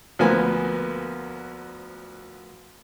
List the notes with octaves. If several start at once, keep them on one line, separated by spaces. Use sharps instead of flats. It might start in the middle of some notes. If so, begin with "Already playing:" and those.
D2 F3 A#3 B3 G#5